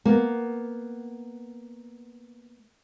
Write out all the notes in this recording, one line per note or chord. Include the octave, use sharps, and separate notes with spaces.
A#3 B3